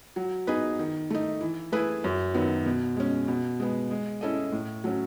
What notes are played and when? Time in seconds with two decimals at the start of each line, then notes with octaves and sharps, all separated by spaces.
0.16 F#3
0.47 B3 D#4 G#4 B4
0.79 D#3
1.10 A3 D#4
1.41 E3
1.72 A3 E4 G#4 B4
2.04 F#2
2.34 D#3 F#3 B3
2.66 B2
2.96 G#3 C#4
3.28 B2
3.60 G#3 B3
3.91 G#3
4.21 C#4 E4 A4 D#5
4.52 A2
4.84 F#3 A3 C#4